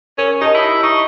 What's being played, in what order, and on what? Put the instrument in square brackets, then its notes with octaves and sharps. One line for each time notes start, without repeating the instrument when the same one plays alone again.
[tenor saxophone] C#4 [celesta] A#4
[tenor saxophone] D#4 [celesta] G4 D#5 A5
[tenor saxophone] E4
[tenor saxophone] D#4 [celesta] C#6